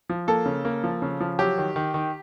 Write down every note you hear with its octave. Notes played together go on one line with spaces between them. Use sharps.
F3
A#3 A4
C#3
A#3
F3
C#3
F3
F#3 G4
D#3
D#3
D#3